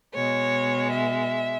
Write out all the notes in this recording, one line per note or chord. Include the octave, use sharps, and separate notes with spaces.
B2 G#3 C#5
E5